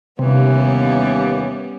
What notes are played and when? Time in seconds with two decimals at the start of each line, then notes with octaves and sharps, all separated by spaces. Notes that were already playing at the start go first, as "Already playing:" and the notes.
0.19 D#2 C3 E3 G3 B3 C#4